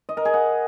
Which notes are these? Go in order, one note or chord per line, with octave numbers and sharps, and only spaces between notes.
D#5
A#4
G#4
F#5